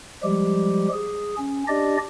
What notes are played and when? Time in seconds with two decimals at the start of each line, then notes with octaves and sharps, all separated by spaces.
0.23 F3 G3 G#3 G4
0.93 G#4
1.38 C#4
1.68 D4 G4 D5 D#5